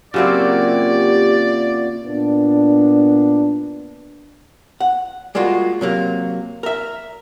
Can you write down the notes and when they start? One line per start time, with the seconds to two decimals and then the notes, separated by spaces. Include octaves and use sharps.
0.14 A#2 C#3 F#3 C4 E4 F#4 G4 D5
2.06 A#2 B3 D4
4.80 F#5
5.35 G3 G#3 A#3 F4 F#4
5.81 C3 F#3 A#3
6.63 A#4 E5